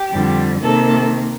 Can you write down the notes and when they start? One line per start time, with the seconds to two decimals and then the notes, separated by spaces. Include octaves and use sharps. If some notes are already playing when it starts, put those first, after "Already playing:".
Already playing: G4
0.10 F2 D3 G3
0.62 C3 D#3 A#3 A4